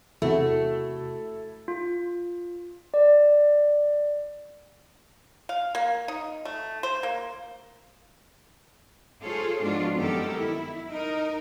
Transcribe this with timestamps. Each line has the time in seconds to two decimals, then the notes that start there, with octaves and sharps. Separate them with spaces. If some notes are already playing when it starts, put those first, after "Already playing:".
0.22 E2 C3 A3 E4 F#4 A4
1.68 F4
2.94 D5
5.49 F5
5.75 A#3
6.08 D#4
6.45 A3
6.83 C5
7.03 A#3
9.23 F4 G#4 A4 C5 C#5
9.62 G#2 F3 B3 D4 F4 F#4
9.96 F#2 D#3 B3 G4 A4 A#4
10.39 E4
10.90 D#4 A#4